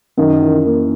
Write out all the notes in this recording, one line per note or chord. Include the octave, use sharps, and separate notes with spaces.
F#2 D#3
E3
A#3